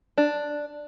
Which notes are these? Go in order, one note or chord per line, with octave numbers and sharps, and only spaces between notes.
D4